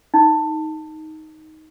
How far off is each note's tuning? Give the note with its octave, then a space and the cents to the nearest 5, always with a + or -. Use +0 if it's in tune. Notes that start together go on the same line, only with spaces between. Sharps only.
D#4 +10